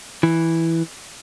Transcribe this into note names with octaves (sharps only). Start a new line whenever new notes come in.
E3